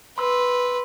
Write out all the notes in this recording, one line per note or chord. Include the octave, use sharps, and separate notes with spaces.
B4 C6 E6